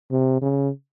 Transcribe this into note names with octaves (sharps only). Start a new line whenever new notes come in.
C3
C#3